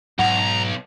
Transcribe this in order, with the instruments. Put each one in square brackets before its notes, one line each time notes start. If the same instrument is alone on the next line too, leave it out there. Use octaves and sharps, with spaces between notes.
[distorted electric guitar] B1 [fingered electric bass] G#2 F#3 [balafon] F#5 [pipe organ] A#5